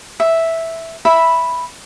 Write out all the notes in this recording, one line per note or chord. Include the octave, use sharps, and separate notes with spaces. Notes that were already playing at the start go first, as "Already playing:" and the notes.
E5
E5 B5